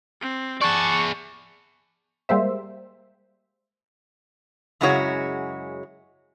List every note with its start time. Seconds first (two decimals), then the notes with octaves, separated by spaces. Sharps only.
0.21 C4
0.61 G#4 D5 F#5 A5 C#6
2.29 G3 G#3 A#3 C5 E5
4.81 F#2 C#3 G#3 E4 F#4 C#5